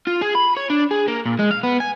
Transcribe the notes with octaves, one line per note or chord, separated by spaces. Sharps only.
F4
G#4
B5
C#5
D4
G#4
A#3
A#2
G#3
F5
B3
G#5